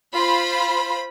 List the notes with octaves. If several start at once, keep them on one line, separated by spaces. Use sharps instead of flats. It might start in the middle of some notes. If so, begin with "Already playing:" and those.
F4 C5 B5